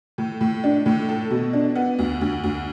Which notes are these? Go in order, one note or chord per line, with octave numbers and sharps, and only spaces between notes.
A2
A2
D4
A2
A4
B2
D4
B3
D2
D2
D2